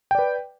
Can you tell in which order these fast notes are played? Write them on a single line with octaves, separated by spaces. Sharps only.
G5 D5 B4